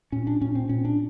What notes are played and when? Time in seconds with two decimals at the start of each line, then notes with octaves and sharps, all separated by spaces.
0.12 A#2 C#4
0.27 D4
0.41 A#2 C#4
0.55 C4
0.69 A#2 C#4
0.85 D4